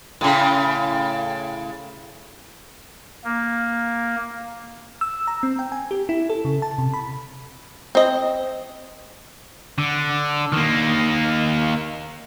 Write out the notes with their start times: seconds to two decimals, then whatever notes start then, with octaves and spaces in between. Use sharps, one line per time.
0.21 A2 C#3
3.24 A#3
5.01 E6
5.27 A#5
5.43 C4
5.59 G5
5.72 G#5
5.91 G4
6.09 E4
6.30 A4
6.45 C#3
6.62 A5
6.78 C3
6.94 B5
7.95 C4 D#5
9.78 D3
10.53 D#3 A#3